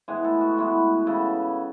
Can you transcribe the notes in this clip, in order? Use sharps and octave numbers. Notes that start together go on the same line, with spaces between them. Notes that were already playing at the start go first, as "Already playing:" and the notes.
A2 E3 G#3 B3 G#4
A4
F#4
A2 E3 G#3 B3
C#3 E3 B3 A4